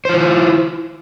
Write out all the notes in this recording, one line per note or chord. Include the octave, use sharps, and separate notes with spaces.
E4 F4 C5